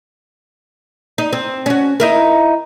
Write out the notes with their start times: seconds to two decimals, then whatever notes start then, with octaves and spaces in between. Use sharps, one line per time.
1.18 D#4
1.33 C4
1.66 C#4 F#4
2.00 D#4 E4 A#4